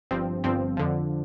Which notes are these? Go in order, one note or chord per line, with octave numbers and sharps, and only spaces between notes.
G1 G2 F3 C4
G1 G2 F3 C4
F2 D3 F3